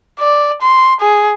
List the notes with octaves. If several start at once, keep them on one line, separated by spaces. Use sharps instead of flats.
D5
C6
G#4